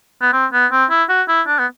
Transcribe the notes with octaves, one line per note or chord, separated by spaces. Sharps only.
B3
C4
B3
C4
E4
F#4
E4
D4
B3